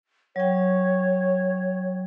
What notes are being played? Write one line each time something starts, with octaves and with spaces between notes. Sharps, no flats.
F#3 C#5 G5